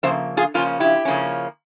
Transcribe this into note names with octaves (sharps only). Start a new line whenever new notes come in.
C#3 F3 A#3 C5 E5
F4 G#4
C#3 F3 A#3 C#4 F4
E4 G4
C#3 F3 A#3 C#4